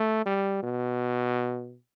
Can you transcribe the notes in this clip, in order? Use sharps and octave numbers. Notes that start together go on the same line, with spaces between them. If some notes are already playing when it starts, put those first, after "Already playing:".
Already playing: A3
G3
B2